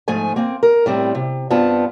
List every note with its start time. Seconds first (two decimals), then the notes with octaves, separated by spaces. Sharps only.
0.08 G#2 F3 A3 G#5
0.36 A#3 C4
0.63 A#4
0.86 A2 G3 C4
1.15 C3
1.50 G2 B3 C4 F4 A5